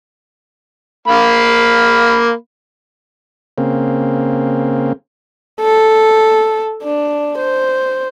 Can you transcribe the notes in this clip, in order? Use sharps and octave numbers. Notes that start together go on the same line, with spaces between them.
A#3 F5 B5
C#3 A#3 C4
A4
D4
C5